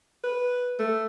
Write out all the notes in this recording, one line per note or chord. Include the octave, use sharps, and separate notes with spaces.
B4
A3